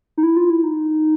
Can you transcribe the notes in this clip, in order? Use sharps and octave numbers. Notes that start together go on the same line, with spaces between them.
D#4
E4
F4
E4
D#4